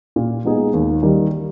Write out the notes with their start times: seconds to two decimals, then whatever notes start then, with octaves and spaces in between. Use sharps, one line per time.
0.16 A#2
0.45 G#3 B3 D#4 G#4
0.74 D#2
1.03 D#3 G3